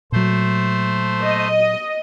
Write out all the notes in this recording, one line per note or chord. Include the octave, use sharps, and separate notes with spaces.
A#2 F#3 A3 C5
D#5